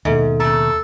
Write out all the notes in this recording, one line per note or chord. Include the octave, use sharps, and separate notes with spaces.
D#2 G#2 B2 A4 E5
C#3 A3 A4 A#5